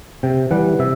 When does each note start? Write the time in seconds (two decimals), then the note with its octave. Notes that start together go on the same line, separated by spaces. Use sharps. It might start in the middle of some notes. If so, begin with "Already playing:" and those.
0.23 C3 G5
0.51 E3 G3 F#5
0.79 C3 E5